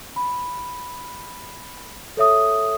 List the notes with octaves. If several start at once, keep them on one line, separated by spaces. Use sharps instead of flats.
B5
A4 C#5 E5 D#6